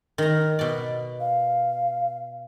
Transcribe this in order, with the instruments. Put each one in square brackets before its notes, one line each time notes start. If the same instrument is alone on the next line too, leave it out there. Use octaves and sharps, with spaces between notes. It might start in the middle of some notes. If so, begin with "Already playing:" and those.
[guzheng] D#3 A#5
B2 D5
[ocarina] F5